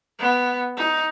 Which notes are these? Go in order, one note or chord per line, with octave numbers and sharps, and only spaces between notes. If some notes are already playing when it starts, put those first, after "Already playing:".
B3
D#4